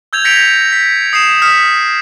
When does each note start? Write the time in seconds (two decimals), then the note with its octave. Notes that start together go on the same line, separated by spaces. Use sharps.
0.13 E6 G6 G#6 F7
0.25 G6 A#6 B6 C#7 D7 F7
0.73 B6
1.13 D#6 C7 D#7 E7
1.42 D#6 F6 B6 C#7